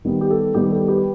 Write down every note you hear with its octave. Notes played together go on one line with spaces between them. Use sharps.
D#3 G3 B3
G4
A4
D#3 G3 B3 G4
A4
G4 B4